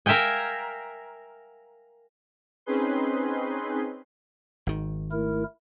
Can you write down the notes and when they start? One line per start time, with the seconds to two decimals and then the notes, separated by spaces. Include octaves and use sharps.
0.06 A#4 E5 F5 G5 G#5
2.66 C4 C#4 D#4 G#4 B4 C6
4.67 G#1 D#3
5.11 A3 E4 A#4